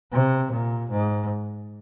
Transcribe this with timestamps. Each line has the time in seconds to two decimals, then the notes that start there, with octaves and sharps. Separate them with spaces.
0.13 C3
0.52 A#2
0.91 G#2